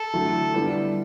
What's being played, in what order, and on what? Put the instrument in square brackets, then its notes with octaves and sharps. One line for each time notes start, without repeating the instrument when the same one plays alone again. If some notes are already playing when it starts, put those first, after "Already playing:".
Already playing: [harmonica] A4
[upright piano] D3 F#3 A3 E4
D3 G3 B3 E4